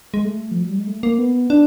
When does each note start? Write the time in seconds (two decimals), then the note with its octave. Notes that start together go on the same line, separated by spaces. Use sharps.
0.14 G#3
0.25 A3
0.51 F3
0.61 F#3
0.69 G3
0.78 G#3
0.87 A3
1.03 A#3
1.19 B3
1.50 D4